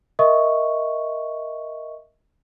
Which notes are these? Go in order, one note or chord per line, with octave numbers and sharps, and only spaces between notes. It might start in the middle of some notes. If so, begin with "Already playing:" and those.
A#4 D#5 E5 C#6